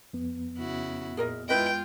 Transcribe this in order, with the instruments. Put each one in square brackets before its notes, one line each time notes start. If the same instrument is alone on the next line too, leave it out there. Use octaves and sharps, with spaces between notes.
[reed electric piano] F2 B3
[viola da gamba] C#3 E4 F#4
[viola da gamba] A#2 [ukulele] G#4 A#4 D#5
[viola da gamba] G#3 F4 [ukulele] E4 B4 D#5 [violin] G5